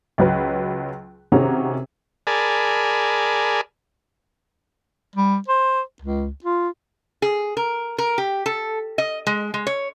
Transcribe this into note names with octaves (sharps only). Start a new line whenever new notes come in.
C#2 F#3 B4
C3 D#3 C#4 F#4 G#4 A#5
G#4 A#4 D5 G#5 A5 B5
G3
C5
C#2
F4
G#4
A#4
A#4
G4
A4
D#5
G#3
G#3
C#5